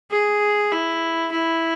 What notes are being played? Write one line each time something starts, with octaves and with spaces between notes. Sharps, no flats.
G#4
E4
E4